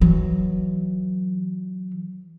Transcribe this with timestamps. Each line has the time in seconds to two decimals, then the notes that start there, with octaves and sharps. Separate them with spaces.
0.01 E3 F#3